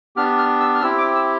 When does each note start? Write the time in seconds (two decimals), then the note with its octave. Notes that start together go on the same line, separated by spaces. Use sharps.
0.16 B3 D4 G4 F6
0.38 F6
0.60 E6
0.75 F6
0.82 C4 E4 G4 E6
0.98 D6
1.15 E6